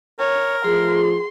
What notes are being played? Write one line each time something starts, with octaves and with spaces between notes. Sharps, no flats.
A#4 C#5
F3 A3 F4 G#4 C6